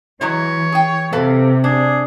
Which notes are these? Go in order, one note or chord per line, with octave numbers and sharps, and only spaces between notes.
E3 F#3 G#3 E4 C#5
G#4 G5
C3 A4 B4 F5
D4 G#4